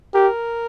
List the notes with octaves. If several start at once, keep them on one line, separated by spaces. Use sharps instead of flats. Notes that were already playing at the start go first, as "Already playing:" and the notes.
G4 A#4